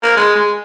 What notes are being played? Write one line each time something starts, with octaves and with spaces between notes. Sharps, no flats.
A#3
G#3
G#3